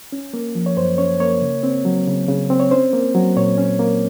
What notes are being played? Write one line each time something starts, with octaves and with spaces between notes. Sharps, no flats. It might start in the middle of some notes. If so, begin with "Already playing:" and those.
C#4
A#3
F3
C#5
F#2 C5
C#4 C#5
A#3 C#5
C#3
C4
F#3
C#3
C#3
C4
C#5
C#4 C5
A#3
F#3
A#2 C#5
C#4
A#3